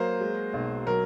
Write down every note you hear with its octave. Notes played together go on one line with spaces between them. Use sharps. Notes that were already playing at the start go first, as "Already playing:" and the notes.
Already playing: F#3 A#3 C5
G#3
B1
F#3 A#4